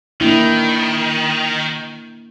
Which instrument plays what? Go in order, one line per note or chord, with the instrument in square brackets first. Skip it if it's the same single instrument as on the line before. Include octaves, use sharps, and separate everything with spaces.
[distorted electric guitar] D#3 [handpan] A#3 D4 E4